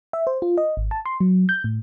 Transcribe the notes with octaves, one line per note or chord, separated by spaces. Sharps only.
E5
C5
F4
D#5
G#1
A5
C6
F#3
G6
A2